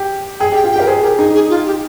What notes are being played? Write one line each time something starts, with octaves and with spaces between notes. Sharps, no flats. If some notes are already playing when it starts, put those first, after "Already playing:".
Already playing: G4
G#4 G5
G4
G5
F4
G5
G4
A#4
G#4 C5
G4 A#4
D#4 G#4
G#4
F4
G4